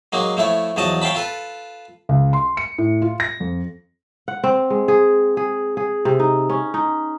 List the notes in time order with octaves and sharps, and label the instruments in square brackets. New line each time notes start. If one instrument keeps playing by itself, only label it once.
[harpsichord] F#3 G#3 A#3 D#4
F3 A3 E4 C#5
E2 F3 F#3 D#5 A5
C#5 F5 G5 A5 B5
F4 A4 B4
[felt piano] C#2
C6
C#7
A2
F4
A#6
F2
[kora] F#5
C4
G#3
G#4
G#4
G#4
C3
D#4
C#4
D#4